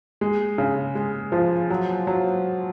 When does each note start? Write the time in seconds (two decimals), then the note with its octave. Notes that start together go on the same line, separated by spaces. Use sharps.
0.21 G#3
0.58 C#3
0.95 G#3
1.32 F3
1.70 F#3
2.07 F#3